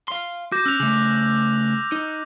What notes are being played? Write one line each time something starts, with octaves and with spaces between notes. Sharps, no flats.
F5 C6
F#4 D6 G6 A#6
C#4 E6 F#6 F7
C#3 A3 F#7
D#4